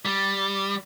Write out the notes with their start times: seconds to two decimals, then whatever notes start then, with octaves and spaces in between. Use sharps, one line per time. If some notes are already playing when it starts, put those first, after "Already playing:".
0.05 G3